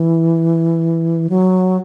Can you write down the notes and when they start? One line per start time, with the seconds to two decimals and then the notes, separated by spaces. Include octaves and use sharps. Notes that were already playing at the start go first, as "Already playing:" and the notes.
Already playing: E3
1.30 F#3